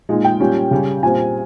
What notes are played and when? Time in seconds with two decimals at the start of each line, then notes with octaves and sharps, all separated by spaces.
0.09 A#2 G#3 D#4
0.24 G5
0.40 A#2 G3 C#4
0.71 C#3 G3 C#4
1.03 A#2 G3 C4 G#5